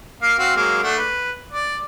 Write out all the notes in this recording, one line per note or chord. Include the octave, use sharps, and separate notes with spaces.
A#3 F5
C4 F#4 F5
F#3 G#3 A#3
A3 D4 F#5
B4
D5